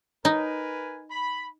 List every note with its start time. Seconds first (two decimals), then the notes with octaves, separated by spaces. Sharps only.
0.25 D#4 A#4 B4 G#5
1.10 B5